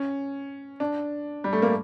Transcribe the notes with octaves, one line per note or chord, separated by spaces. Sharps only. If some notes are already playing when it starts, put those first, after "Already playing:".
Already playing: C#4
D4
G3
A3
A#3